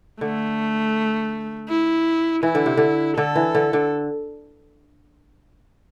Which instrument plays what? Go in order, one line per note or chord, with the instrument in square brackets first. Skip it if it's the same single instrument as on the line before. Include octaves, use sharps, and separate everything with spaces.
[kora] D3 [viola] A3
[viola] E4
[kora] E3 [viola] E4
[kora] D3
C3
D3
[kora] D3 [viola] A4
[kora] E3
D3
D3